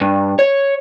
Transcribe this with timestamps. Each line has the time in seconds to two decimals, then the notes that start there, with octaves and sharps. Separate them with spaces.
0.01 G2
0.39 C#5